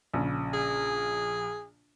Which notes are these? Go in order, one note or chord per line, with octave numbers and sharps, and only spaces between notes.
A#1 C#3
G#4